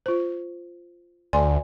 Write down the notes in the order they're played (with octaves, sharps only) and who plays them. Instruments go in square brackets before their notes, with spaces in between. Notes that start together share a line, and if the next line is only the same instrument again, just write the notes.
[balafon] F4 C5
[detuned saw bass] D2 [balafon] D5 G#5 C6